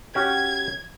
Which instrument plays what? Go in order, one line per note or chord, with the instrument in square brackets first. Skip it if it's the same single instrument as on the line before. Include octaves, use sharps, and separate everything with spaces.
[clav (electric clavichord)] C#4 F#4 G4 [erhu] G#6